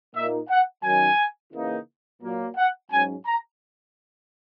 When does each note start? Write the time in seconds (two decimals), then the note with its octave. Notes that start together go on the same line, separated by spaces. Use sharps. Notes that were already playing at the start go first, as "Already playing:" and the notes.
0.15 A#2 A#3 D#4 E5
0.49 F#5
0.84 D#3 F#3 C#4 G#5
1.53 C#3 E3 A#3 D#4
2.22 A#2 F#3 A#3
2.57 F#5
2.91 G#2 F#3 C#4 G#5
3.26 A#5